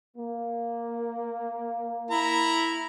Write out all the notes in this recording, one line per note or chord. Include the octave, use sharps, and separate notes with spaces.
A#3
E4 A#5